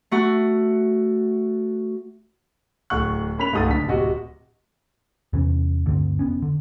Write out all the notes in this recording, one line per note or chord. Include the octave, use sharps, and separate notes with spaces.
A3 F#4
D1 A3 F#5 C#6 F#6
A#3 C#4 B5 B6 F7
C#2 G#2 A3 G#4 D#6 A6
F#1 D2 D4 B6
D1 C3 F#4 D#5
E2 C3 E3 C#4
D2 G2 D3 C4
F1 B3 C#4
D3